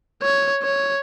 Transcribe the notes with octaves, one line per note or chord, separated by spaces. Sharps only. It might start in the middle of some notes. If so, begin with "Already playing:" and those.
C#5
C#5